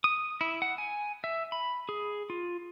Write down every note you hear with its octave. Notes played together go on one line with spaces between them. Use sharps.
D#6
E4
F#5
G#5
E5
B5
G#4
F4